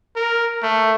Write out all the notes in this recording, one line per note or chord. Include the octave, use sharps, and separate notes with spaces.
A#4
A3